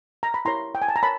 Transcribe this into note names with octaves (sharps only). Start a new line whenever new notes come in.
A#5
B5
E4 G4 A#4 C#5 A#5 C6
G5
G#5
A5
A#5
A#4 C#5 A5 B5